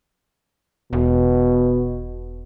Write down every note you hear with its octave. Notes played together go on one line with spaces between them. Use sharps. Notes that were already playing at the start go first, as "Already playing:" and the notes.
E1 B2